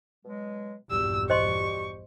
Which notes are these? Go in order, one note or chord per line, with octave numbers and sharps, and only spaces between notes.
B2 F#3 G#3
A#1 E2 G2 G3 F#4 G4 E6
C5 D#5 C6 C#6